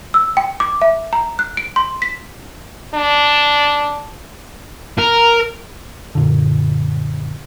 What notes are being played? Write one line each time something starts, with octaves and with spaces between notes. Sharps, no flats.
E6
G5
D6
E5
A#5
F#6
D7
C6
B6
D4
A#4
F#2 A#2 D3